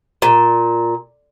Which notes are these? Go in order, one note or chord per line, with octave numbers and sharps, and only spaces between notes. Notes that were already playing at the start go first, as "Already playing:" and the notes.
A#2